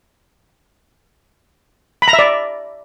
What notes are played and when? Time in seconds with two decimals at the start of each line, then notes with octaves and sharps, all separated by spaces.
2.02 B5
2.08 A#5
2.13 E5
2.19 D5